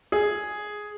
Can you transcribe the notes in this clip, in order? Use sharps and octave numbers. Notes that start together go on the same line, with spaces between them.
G#4